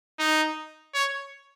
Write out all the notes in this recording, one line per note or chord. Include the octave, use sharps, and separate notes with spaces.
D#4
C#5